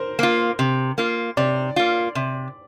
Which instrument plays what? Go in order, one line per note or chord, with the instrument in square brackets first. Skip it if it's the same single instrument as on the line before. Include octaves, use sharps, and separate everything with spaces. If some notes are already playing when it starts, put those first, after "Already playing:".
Already playing: [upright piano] A#4 C5
[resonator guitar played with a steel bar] A#3 F4
C3
A#3 F4
[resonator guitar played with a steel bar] C3 [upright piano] D5
[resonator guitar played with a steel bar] A#3 F4
C3